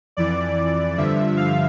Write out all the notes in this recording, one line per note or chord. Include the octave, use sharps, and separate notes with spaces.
F2 E3 D5
G2 D3 F3 E5
F5